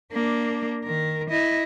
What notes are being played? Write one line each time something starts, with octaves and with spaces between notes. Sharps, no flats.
A#3 D4
D#3 A#4
E4 D#5